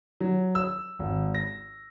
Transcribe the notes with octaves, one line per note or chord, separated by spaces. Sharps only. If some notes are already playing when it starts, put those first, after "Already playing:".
F#3
E6
G#1
A#6